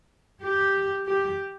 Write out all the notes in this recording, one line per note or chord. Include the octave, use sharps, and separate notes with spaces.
G4
G4